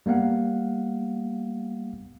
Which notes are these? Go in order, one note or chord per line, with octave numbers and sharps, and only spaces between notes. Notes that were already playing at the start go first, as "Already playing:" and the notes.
G3 A#3 B3 F5 F#5